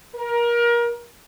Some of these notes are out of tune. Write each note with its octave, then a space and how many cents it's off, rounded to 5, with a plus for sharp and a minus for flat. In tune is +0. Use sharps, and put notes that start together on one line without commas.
A#4 +25